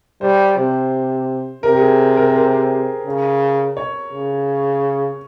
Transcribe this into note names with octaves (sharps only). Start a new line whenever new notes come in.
G3 C5
C3
C3 A#4
G4
G#4
A#4
C5
A#4
C#3
C#5
C#3